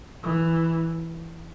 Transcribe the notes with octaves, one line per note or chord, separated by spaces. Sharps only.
E3